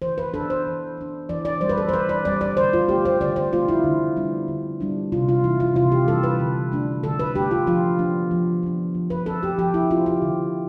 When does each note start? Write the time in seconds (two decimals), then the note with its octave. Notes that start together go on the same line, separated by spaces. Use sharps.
0.02 E3 C5
0.18 B4
0.34 B3 D4 A4
0.50 C5
0.66 E3
0.98 B3 D4
1.29 E3 D5
1.45 D5
1.61 G3 C4 C5
1.69 B4
1.78 A4
1.89 C5
1.93 E3 B4
2.09 D5
2.25 G3 C4 D5
2.41 D5
2.57 D3 C5
2.73 F4
2.89 A3 C4 G4
3.05 C5
3.21 D3 D5
3.36 C5
3.53 A3 C4 F4
3.68 E4
3.84 D3
4.17 G3 B3 D4
4.48 D3
4.80 G3 B3 D4
5.12 C3 F4
5.29 F4
5.44 E3 G3 D4 E4
5.60 F4
5.75 C3 F4
5.92 G4
6.07 E3 G3 D4 A4
6.23 B4
6.40 D3
6.72 A3 D4
7.03 D3 A4
7.19 B4
7.35 A3 D4 G4
7.51 F4
7.67 F3 F4
7.99 B3 D4
8.31 F3
8.63 B3 D4
8.95 F3
9.10 B4
9.26 C4 A4
9.43 G4
9.58 F3 G4
9.74 E4
9.90 C4 F4
10.06 G4
10.22 D3